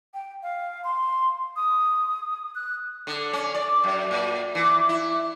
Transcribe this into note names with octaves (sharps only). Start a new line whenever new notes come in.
G5
F5
C6
D#6
F#6
D3
C#4
D5
F#2
A#2
E3
E4